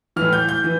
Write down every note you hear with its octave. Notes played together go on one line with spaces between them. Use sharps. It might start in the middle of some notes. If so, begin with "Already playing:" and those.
A2 E3 F6
G6
G6
E3